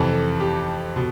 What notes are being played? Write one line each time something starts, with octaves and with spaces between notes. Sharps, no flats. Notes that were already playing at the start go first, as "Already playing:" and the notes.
Already playing: F2 C3 E3 A4
G4
B2